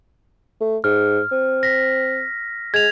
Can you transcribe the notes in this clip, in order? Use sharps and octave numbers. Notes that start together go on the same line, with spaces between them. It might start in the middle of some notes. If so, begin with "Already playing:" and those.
A3
G#2 F6
C4
A#6 B6
G#3 G#6 F7